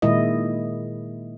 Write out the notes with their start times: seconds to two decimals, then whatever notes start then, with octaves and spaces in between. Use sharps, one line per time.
0.02 A#2 D#3 G#3 E4 D#5